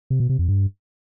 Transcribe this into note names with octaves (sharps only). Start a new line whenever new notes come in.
C3
B2
C3
F2
G2